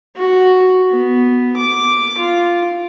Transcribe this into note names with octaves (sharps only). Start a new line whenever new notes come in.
F#4
B3
D6
F4